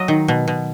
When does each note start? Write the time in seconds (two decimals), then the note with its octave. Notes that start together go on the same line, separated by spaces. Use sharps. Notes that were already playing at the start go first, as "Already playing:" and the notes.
Already playing: F#3 D#5
0.08 D#3
0.28 B2
0.48 B2